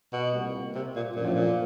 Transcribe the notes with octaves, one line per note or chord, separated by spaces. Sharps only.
B2
C2 A#2 G3 A#3
C3
A#2
F#2 A#2 D3 F3
A2
A#2